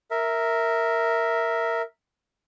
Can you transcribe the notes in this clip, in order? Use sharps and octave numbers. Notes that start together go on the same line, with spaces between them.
A#4 E5